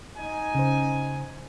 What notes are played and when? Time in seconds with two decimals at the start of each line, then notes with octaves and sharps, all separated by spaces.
0.17 D#4 G#5
0.55 C#3 C5